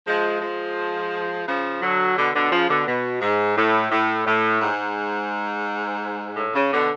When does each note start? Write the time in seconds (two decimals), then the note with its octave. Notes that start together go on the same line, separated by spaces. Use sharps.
0.07 F3 G#3
0.41 F3 G#3
1.47 C#3 F3
1.81 D3 F#3
2.16 B2 D3
2.34 B2 D3
2.51 C#3 F3
2.69 B2 D3
2.87 B2
3.21 G#2
3.57 A2
3.91 A2
4.27 A2
4.61 G#2
6.36 A2
6.54 C#3
6.71 B2 D3